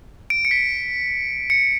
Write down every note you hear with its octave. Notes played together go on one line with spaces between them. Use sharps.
D7
C#7
B6
C#7